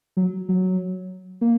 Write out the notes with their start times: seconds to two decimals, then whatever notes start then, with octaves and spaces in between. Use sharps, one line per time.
0.17 F#3
0.49 F#3
1.41 A#3